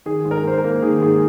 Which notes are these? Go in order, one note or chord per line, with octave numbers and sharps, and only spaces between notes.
D#3 G#4
G#2
A#4
G#2 C5
A#4
A#3
D#3 G#4
G#2 G#4